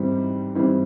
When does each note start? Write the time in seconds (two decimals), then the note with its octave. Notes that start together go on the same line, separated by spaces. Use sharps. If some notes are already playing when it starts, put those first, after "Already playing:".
Already playing: G#2 E3 G3 C4
0.55 G#2 E3 G3 C4